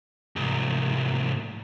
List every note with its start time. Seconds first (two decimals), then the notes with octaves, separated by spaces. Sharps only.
0.36 C2 G#2